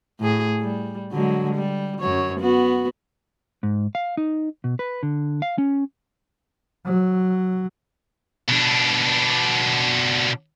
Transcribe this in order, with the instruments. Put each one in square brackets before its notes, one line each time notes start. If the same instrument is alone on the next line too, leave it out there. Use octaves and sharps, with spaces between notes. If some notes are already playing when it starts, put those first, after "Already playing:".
[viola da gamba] A2 G#4
G3
D3 F#3 G#3
G3
F#2 F#3 C#5
B3 F#4
[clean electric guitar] G#2
F5
D#4
B2
B4
D3
F5
C#4
[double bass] F#3
[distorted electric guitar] B2 D4